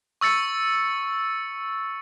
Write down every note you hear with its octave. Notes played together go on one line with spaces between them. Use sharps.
C#6 E6 A6 C#7